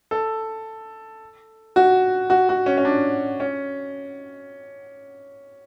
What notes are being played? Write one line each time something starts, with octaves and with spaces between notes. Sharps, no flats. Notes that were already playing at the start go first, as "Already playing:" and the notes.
A4
F#4
F#4
F#4
C#4
C#4
D4
C#4